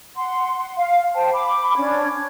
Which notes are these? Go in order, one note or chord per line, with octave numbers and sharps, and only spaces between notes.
F#5 C6
F5
C5 G5 A5
B5 D6
C#4 D4 G#6